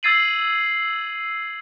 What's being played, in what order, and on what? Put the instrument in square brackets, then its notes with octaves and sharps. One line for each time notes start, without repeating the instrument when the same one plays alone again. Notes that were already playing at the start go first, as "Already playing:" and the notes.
[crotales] E6 G#6 A6 C7 D#7 F#7